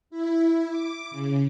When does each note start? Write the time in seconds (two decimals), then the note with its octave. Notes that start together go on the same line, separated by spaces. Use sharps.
0.10 E4
0.69 D6
1.11 C#3